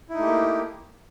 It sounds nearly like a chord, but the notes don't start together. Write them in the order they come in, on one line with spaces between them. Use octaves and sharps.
E4 D#4 A3 G4 A#3